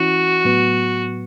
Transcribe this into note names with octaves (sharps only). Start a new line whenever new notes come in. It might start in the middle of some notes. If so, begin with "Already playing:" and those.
Already playing: E3 C#4 E4 F#4
A2 F#3 B3